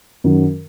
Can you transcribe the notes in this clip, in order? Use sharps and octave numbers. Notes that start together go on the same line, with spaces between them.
F#2 D#3 F#3